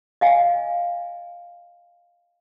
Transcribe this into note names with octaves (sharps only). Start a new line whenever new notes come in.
D#5 F5 G#5